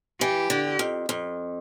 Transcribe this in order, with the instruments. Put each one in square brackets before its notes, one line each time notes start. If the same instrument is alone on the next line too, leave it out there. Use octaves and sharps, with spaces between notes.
[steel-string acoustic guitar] E3 [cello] G4
[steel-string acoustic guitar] D3
F2
F2